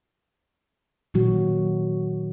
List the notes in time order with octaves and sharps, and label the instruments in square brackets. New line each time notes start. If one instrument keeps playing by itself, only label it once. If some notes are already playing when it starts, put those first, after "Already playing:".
[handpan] A#2 D#3 F#3 F#4